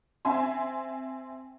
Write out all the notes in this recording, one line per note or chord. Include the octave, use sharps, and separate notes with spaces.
C4 E5 G#5 C6